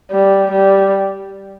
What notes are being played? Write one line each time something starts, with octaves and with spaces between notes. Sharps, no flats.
G3
G3